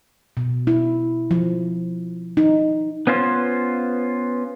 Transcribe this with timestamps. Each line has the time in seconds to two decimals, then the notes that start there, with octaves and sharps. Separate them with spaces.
0.37 B2
0.67 E4
1.31 F3
2.37 D#4
3.07 B3 C#4 F4 A4 C5